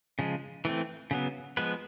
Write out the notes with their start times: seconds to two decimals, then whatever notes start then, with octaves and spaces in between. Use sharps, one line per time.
0.19 C#3 F3 G#3
0.65 E3 A3 C4
1.11 C#3 F#3 B3
1.57 F3 G#3 B3 B4